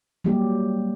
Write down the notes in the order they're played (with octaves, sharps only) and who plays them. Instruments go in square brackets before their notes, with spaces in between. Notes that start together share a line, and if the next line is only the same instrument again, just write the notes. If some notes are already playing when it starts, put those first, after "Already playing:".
[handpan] F#3 G3 A#3 G4